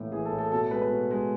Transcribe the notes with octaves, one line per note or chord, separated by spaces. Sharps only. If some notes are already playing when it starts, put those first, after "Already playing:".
Already playing: A2 E3 A#3
E3 G#4
A4
A2
A4
B2 A4
G#3 B4
B4
B2
G#3